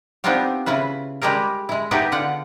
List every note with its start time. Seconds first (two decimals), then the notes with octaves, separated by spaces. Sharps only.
0.24 B3 C4 D4 D#4 F4 G4
0.66 C#3 E4 F4 B4
1.22 G3 G#3 G4 G#4 A#4
1.69 G#3 E4
1.91 B3 D#4 E4 G4 G#4 B4
2.12 D3 F4 F#5